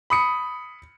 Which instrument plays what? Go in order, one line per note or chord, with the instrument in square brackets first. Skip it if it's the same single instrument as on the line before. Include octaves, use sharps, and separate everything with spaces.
[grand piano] B5 D#6 C#7